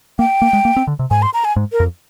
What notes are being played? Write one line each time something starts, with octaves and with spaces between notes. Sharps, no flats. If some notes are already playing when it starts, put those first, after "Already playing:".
A#3 G5
A#3
G#3
A#3
C4
D3
C3
G#2 G#5
C6
A#5
G#5
G#2
A#4
F2